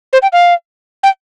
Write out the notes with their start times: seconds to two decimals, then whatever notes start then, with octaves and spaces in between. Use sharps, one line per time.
0.13 C5
0.22 G5
0.33 F5
1.03 G5